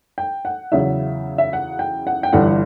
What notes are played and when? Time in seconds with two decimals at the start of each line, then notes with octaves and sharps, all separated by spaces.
0.18 G5
0.45 F#5
0.72 E2 C#3 F#3 E5
1.38 E5
1.53 F#5
1.79 G5
2.07 F#5
2.23 G5
2.33 G1 G2 E3 F#5